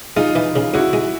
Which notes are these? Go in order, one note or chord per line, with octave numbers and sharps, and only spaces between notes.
G#3 D#4 F4
E3
C#3
C#2 E4 F#4
G#3